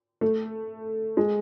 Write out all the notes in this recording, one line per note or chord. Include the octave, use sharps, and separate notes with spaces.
A3
G#3